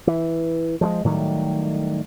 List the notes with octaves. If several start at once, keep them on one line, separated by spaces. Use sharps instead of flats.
E3
F3 F#3 G#3
A2 D#3 F#3 G3